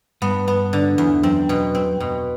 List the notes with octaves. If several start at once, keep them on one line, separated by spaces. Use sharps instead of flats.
G2 B3
B3
D3
E2
F#2 C4
B2
C4
B2